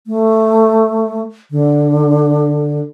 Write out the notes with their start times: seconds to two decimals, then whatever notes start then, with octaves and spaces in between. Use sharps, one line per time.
0.07 A3
1.51 D3